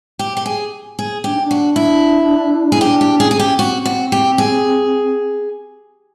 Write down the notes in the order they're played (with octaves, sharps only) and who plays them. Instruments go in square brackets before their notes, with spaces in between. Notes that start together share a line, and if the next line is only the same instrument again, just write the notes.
[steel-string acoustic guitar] G4
G4
G#4
G#4
[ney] D4 [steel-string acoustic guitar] G4
[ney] D#4
D4
[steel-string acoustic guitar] F#4
E4
[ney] C#4 [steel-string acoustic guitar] G#4
[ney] D4 [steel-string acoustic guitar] G4
[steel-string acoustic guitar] G4
[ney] C#4 [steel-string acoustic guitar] G#4
[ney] C4 [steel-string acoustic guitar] G#4
[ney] C#4 [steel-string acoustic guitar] G4
[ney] C4 [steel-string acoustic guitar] F#4
[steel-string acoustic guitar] F#4
G4
G#4